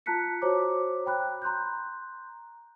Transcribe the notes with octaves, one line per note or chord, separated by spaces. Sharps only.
F4 A5 A#5 F#6 B6 C#7
F#4 C5 C#5 A#5 D6
G5 B5 F#6
A#5 C6 F#6 G6